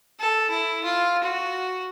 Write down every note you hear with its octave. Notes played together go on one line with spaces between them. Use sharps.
A4
E4
F4
F#4